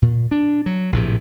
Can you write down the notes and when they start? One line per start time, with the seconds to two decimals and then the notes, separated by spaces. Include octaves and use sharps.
0.02 A#2
0.31 D4
0.66 F#3
0.92 A#1 A2 C3